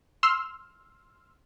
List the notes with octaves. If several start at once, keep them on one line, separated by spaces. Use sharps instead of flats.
C6 E6 F6